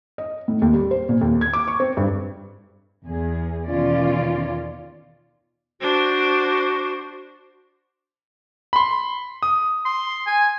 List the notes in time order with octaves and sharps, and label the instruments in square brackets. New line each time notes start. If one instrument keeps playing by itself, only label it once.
[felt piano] D#5
A2
D#2
G3
C5
A#2
D#2
G#6
D6
C#6
C4
G2
[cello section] E2 G#4
E2 B2 D#3 C#4 F4 D5
[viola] D4 C5 [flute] F#4
[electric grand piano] B5 C6
D#6
[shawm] C6
G#5